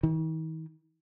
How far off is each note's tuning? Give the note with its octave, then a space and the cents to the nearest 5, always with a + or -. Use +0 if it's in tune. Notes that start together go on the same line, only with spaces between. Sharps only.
D#3 +45